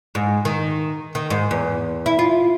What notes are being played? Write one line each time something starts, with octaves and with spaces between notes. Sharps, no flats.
G#2
D#3
D#3
G#2
E2
E4
F4